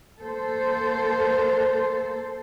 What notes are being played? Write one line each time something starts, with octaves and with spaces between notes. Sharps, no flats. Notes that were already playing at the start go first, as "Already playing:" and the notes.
A#3 A4 C5